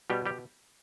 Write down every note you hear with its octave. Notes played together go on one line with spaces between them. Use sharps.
B2 G3 G4
G3 G4